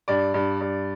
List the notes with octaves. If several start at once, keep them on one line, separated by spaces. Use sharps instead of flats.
G2 D5
G2
G2